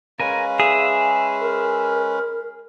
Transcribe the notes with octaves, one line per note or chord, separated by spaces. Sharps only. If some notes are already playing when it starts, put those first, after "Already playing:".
G#3 C#4 A#4 B4 F5 G#5
G#4 E5
A#4